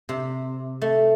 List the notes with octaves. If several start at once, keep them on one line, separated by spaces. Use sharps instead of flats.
C3
A3